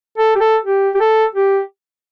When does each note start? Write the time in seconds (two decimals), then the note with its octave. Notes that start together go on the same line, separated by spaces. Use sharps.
0.18 A4
0.35 G4
0.40 A4
0.65 G4
0.95 G4
1.00 A4
1.35 G4